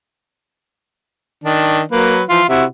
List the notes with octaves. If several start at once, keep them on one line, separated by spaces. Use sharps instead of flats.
D#3 D4
F#3 A#3 B4
E3 F3 F4
C3 E4 F#4 E5